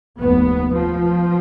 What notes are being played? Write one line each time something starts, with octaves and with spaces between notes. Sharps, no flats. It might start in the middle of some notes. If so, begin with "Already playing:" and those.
F1 D#2 B3
F3